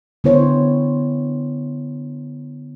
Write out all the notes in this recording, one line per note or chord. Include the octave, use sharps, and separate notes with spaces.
D3 B3 E4 C5 C#5